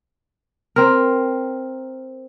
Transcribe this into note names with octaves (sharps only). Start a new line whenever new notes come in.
C4 A#4